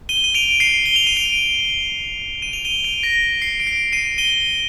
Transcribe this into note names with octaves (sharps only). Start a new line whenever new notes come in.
D#7 G7
D#7
D7 F7
C7 D#7
G7
F7
D#7
D7 F7
D#7
F7
D#7 G7
D7 F7
A#6 D7
C7
D7
C7
C7 D#7
D#7 G7